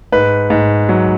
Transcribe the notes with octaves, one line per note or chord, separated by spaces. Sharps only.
G#2 B4
G#2
F#3